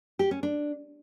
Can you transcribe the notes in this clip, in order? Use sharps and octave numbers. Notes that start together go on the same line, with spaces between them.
G4
C#4
D4